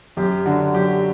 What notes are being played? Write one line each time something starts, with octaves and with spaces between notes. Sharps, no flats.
F#2 G4
D3 F#4
F#3 G4